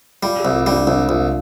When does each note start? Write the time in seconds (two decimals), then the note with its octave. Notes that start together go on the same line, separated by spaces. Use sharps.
0.23 G3 F4
0.40 G4
0.45 C2
0.55 F4
0.66 G3 D4
0.87 C2 D4
1.09 C2 F4